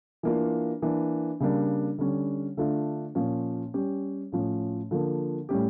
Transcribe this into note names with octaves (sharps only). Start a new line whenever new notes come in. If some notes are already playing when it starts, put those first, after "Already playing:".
E3 A#3 D4 F4
E3 A#3 D4
C#3 G3 A#3 D4
D3 G3 C#4
D3 A3 D4 F4
A#2 F3 C#4
G3 C#4 G4
A2 F3 C#4
D3 F3 A#3
A2 G3 C#4 G4